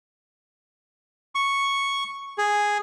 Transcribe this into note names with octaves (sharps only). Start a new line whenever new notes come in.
C#6
G#4